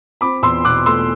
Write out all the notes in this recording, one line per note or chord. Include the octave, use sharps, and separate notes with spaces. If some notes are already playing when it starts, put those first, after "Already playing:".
C4 B5 D6
E2 C6 E6
B2 D6 F#6
A3 C6 E6